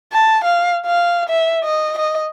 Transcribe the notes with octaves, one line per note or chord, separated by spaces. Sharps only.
A5
F5
F5
E5
D#5
D#5